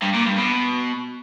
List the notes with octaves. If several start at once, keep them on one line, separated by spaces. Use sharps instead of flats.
G2
A#2
G2
B2